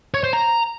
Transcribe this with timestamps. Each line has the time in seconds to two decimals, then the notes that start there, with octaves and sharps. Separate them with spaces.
0.14 C#5
0.24 C5
0.33 A#5